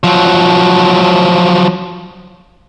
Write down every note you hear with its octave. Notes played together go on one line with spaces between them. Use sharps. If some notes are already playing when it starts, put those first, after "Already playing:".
F3 F#3